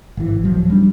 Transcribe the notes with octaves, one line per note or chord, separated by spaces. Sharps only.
G#1 E3
D1 F3 F#3
G3 D4